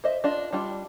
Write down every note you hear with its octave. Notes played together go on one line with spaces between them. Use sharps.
C5 D#5 E5
D4 F4 D#5
G3 D4 F4